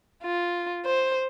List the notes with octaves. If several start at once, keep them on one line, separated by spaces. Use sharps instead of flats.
F4
C5